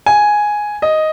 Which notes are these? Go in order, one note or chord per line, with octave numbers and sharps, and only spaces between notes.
G#5
D#5